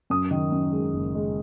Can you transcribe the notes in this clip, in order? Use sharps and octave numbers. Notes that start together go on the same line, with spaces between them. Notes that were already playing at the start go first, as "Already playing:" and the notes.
F#2 D#6
D#3
F#2
G#3
F#1
G#3